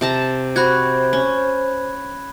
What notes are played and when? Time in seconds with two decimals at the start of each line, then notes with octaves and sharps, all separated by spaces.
0.01 C3 A5 A#5
0.56 F#4 C5 B5 F#6 G#6
1.13 C#4